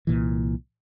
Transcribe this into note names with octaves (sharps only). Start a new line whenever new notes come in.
C2 A#2 E3